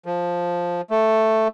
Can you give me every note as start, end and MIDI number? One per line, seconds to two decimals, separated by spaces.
0.06 0.81 53
0.90 1.48 57